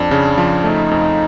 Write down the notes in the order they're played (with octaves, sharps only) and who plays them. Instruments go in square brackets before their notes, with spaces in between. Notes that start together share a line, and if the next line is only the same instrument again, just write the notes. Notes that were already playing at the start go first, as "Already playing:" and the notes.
Already playing: [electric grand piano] F2 [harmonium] D4
[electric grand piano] C#3
F3
[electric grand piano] A3 [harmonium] D#4
[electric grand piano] F2